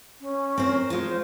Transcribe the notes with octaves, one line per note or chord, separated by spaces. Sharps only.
C#4
C4 A#4 C5
G#3 F4 C5